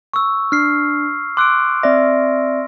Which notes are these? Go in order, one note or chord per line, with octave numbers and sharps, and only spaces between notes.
C#6 E6
D4 F6 C7
C6 D6 E6 F#6 D7
C4 D5 E5 A#6